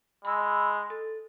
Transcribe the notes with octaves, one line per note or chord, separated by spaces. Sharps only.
G#3 B5 E6
A4